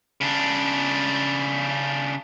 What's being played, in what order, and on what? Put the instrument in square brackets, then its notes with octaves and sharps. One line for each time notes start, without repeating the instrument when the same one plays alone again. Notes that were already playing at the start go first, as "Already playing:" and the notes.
[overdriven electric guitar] C#3 D4